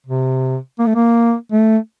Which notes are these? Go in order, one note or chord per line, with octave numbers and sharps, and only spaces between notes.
C3
A#3
A3
A#3
A3